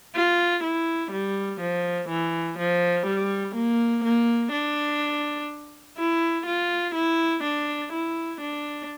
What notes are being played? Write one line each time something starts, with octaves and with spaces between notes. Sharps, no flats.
F4
E4
G3
F3
E3
F3
G3
A#3
A#3
D4
E4
F4
E4
D4
E4
D4